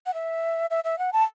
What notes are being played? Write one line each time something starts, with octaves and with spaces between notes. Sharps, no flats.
F#5
E5
E5
E5
F#5
A5